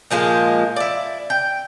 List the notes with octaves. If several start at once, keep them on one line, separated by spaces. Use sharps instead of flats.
A#2 F3 G#3 A#3
E4 D5
G5